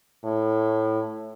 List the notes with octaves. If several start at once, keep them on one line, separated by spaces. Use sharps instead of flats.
A2